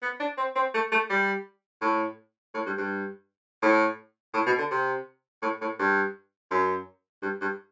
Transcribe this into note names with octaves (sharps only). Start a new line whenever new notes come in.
B3
D4
C4
C4
A3
A3
G3
A2
A2
G2
G2
A2
A2
B2
D3
C3
A2
A2
G2
F#2
G2
G2